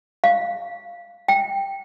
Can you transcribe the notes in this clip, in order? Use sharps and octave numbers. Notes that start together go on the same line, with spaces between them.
F5
G5